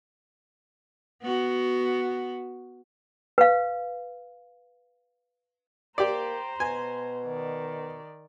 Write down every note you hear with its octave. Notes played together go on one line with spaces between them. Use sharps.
B3 F#4
B4 F5
A#3 G4 C5 D5 A#5
B2 G#5
D#3 D5